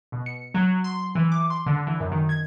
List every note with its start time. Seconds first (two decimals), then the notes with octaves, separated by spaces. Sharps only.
0.12 B2
0.26 C#7
0.54 F#3
0.84 C6
1.15 E3
1.32 D6
1.50 C6
1.66 D3
1.87 E3
2.00 F#2
2.12 D#3
2.29 G#6